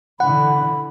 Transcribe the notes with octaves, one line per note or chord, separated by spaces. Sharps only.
D3 E3 F#5 B5